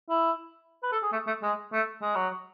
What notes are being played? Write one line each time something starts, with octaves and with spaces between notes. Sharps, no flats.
E4
B4
A4
G#4
A3
A3
G#3
A3
G#3
F#3